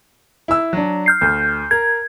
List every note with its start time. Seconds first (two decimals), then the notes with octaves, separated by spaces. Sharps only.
0.48 E4 E6
0.73 F#3 D4
1.06 F6 G6 C7
1.21 D2
1.71 A#4 G#6